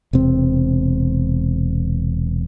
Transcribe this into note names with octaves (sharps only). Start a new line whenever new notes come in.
E1 C3 C4